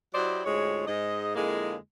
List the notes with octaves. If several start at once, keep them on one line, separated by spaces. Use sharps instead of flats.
F#3 E4 G4 C5 D5 D#5
D2 G#2 G#3 F4 C#5
G#2 D#5
F2 D3 G#3 A#3 E4 G#4